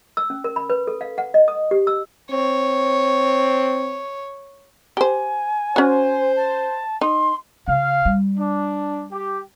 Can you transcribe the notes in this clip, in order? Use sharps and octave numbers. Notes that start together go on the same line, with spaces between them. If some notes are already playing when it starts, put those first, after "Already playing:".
E6
C#4
A#4
B5
B4
A4
F5
F#5
D#5
D#6
G4
E6
C4 C#5
G4 C5 G#5
C#4 F#4 C5
A5
D#4 C6
C#3 F5
G3
D4
G4